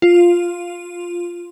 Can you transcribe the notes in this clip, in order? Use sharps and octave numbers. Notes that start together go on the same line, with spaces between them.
F4